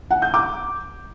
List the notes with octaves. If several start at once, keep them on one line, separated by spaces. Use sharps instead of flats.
F#5
G6
D6